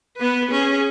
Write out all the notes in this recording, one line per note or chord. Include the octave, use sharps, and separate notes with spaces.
B3 B4
C#4 G#4